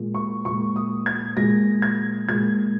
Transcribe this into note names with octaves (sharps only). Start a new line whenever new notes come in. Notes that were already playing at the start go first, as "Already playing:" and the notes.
Already playing: A#2 G#3
C#6
A#2 G#3 C#6
D#6
G#6
A#2 G#3 A#6
G#6
A#2 G#3 G#6